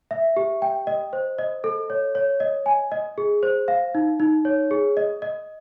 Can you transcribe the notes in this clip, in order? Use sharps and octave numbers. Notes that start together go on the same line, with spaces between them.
E5
G4
G5
D#5
C5
D#5
A4
C#5
C#5
D#5
G#5
D#5
G#4
C5
F5
D#4
D#4
C#5
G#4
D#5
D#5